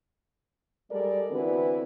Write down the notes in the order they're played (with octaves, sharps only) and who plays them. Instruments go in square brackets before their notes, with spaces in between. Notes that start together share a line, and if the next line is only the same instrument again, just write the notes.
[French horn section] G3 G#3 A4 A#4 D5
D3 E3 B3 C4 F#4 B4